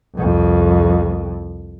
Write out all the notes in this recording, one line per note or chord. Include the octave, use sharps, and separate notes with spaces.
C2 F2